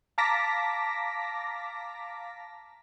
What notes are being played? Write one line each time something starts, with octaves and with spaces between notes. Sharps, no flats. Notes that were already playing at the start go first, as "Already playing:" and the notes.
F5 A5 A#5 D6 A#6 B6